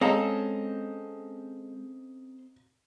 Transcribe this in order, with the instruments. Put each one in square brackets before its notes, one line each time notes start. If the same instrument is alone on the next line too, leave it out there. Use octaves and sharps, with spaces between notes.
[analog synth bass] G#3 [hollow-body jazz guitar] C4 C#4 A4 [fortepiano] D#5 F5 A#5